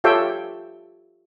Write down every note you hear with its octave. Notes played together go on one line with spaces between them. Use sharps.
F4 G4 A4 C#5 E5 G5